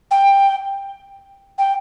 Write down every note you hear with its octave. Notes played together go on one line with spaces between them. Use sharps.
G5
G5